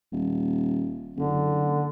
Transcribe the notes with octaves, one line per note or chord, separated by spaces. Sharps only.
D#1
F#1 D3